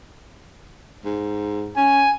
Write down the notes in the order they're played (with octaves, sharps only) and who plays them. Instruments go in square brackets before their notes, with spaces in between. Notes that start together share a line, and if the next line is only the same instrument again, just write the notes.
[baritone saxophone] G#2
[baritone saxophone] C#4 [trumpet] G#5